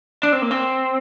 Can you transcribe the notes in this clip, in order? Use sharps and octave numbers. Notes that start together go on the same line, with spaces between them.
D4
C4
A#3
C4